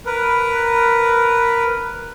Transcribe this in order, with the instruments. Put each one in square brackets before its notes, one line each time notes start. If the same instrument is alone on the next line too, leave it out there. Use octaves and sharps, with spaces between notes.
[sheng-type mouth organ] A#4 B4